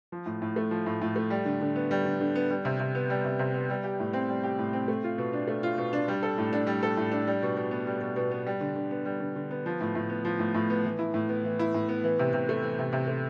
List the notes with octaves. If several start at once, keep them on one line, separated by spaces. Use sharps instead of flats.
F3
A2
A2
A3
F3
A2
A2
A3
G3
D3
D3
B3
G3
D3
D3
B3
G3
C3
C3
B3
G3
C3
C3
B3
G3
G4
A2
C4
G3
G4
A2
C4
A3
F4
B2
D4
A3
F4
B2
D4
G3
A4
A2
D4
G3
A4
A2
D4
G3
B2
B2
B3
G3
B2
B2
B3
G3
D3
D3
B3
G3
D3
D3
B3
F3
A2
A2
B3
F3
A2
A2
B3
E3
E4
A2
B3
E3
E4
A2
B3
E3
C3
C3
A3
E3
C3
C3
A3